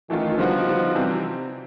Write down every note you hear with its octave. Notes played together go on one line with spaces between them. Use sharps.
D#3 E3 A3 C#4 F4
D3 F3 G3 B3 D#4 F#4
D3 G3 B3 D#4 F#4
C3 E3 G3 C4